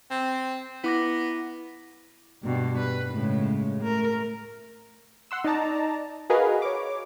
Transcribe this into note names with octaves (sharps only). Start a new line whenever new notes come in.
C4
B3 E4 D6 A#6
G2 B2 G3
B4
A2 C#3 G#3
A3 A#4
F#5 C6 E6
D#4 D5 A5 A#5
F#4 G#4 A#4 B4 D#5 F5
C#5 D6